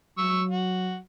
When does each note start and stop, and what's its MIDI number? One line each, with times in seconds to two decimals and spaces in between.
0.18 0.98 54
0.18 0.42 85
0.18 0.42 88
0.49 0.97 66